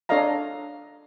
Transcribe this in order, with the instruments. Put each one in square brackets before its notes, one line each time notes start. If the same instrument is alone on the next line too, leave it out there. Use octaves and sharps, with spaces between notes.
[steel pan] D4 A4 C#5 D#5 F5 A#5